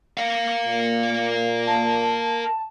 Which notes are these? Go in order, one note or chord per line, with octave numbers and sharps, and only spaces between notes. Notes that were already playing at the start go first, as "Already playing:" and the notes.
A#4 F5 C#7
A#2
A5